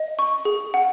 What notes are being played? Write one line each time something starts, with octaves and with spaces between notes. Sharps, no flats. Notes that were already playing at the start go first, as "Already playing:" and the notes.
Already playing: D#5
C#6
G#4
F#5